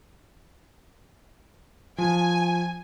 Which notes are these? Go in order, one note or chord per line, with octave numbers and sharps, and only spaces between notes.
F3 G#5